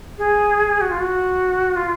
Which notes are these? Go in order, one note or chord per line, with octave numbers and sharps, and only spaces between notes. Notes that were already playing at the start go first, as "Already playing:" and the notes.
G#4
F#4
F4
F#4
F4